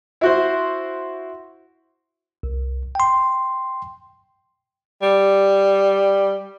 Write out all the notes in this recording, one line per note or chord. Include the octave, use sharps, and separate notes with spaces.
E4 F#4 C5
C2
G5 C6
G3